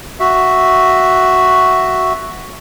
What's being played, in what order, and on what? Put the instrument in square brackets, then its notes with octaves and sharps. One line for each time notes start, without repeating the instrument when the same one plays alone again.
[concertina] F#4 E5